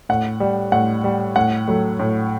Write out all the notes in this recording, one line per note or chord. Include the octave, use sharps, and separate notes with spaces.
A2 F#5
G3
A2 F#5
G3
A2 F#5
F#3 A3
A2